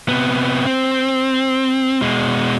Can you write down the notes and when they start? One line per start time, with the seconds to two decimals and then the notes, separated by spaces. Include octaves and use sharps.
0.09 C3 B3
0.66 C4
2.02 B2 G#3